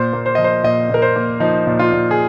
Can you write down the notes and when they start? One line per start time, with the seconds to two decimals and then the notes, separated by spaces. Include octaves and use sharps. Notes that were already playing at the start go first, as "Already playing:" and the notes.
Already playing: A#2 C5
0.13 A#3
0.26 C5
0.35 F3 D#5
0.44 C5
0.63 A#2 D#5
0.89 A#2 A#4
1.02 C5
1.16 A#3
1.40 F3 D#4
1.67 A#2
1.79 F4
1.92 A#2
2.11 G#4